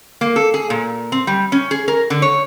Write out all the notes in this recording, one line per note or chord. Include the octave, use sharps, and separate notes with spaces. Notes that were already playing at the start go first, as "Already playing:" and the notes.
A#3
A4
G#4
A#2
C4
G3
C#4
G#4
A#4
D3
C#5